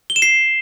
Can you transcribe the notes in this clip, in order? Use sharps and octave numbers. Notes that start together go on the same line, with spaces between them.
G7
E7
C7